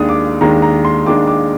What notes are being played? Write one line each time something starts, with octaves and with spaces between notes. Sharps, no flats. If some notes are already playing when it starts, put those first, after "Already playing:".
Already playing: D#2 D#3 G#3 D4 D#6
D6
D#2 D#3 G#3 D4 A#5
A#5
C6
D#2 D#3 G#3 D4 D6
D6